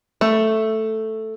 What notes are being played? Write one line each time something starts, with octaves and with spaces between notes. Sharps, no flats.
A3